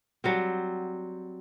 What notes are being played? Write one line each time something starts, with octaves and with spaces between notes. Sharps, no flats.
F#3 G3 C4